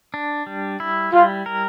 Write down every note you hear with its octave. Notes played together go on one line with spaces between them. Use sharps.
D4
G3
E4
G3 F4
A#4